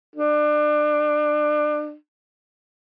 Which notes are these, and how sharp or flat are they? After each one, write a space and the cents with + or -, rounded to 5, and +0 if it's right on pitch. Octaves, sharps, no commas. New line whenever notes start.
D4 +30